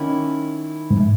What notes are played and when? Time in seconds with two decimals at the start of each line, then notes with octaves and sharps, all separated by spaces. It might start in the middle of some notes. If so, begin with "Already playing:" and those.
Already playing: D#3 A#3 C#4 E4
0.91 G#2